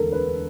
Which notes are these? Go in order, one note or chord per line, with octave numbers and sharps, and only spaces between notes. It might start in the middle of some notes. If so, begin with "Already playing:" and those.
Already playing: E1 D2 D3 A4 A#4
B4